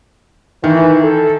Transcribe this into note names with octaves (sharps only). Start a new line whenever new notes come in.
D#3 E3
A4